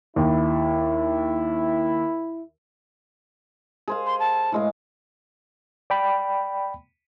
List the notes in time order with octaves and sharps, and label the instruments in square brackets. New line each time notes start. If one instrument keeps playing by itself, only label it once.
[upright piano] D#2 [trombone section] E4
[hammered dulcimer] G#4 C5 F5
[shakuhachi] C6
A5
[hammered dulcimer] A2 G#3 F5
[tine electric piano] D5 G5 B5